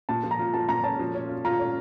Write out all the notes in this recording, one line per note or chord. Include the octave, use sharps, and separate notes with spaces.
A#2 A5
F3
A#5
F4
F3 A5
A#2 A#5
C#4 A5
F3
C#4
F4
F4 A#5
C#4